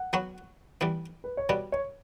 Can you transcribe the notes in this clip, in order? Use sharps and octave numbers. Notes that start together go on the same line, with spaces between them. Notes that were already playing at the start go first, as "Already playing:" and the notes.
Already playing: F#5
F#3 B3 F#4
E3 G3 B3
B4
C#5
B2 G3 B3 D5
C#5